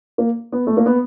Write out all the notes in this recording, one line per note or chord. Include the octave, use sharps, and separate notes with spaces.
A#3
B3
A3
A#3
B3